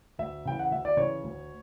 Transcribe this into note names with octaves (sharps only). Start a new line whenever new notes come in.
D2 E5
C#3 E3 G5
F#5
D2 E5
D5
C#3 E3 C#5
D2